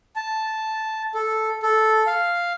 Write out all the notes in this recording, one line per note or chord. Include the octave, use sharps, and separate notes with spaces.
A5
A4
A4
F5